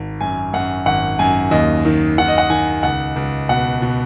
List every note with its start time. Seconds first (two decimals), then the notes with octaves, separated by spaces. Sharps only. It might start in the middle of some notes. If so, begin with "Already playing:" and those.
Already playing: G#1
0.21 F#2 G#5
0.53 F#2 F#5
0.86 G#1 F#5
1.19 F#2 G#5
1.51 D#2 D#5
1.85 D#3
2.18 D#3 F#5
2.28 D#5
2.38 F#5
2.50 D#3 G#5
2.83 C#2 F#5
3.16 C#2
3.49 B2 F#5
3.82 B2